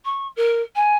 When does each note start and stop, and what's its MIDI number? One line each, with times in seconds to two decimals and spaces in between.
0.05 0.28 85
0.36 0.62 70
0.75 0.97 80